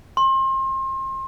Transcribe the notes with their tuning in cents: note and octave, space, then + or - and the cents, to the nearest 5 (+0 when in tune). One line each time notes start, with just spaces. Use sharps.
C6 +35